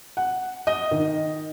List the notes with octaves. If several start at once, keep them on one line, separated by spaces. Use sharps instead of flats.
F#5
D#5
D#3